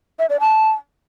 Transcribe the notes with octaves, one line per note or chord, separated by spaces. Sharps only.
E5
D5
A5